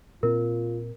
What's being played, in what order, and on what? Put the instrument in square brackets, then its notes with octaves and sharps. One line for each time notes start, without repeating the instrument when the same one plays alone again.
[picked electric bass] A#2 C4 [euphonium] F4 [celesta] A#4